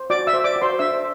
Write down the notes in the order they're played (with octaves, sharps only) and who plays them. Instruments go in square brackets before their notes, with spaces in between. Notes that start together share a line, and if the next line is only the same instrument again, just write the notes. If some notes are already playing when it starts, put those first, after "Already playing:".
Already playing: [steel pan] C5
F#4 D5 D6
E5 E6
C5
D5 D6
F#4
C5 C6
D4 E5 E6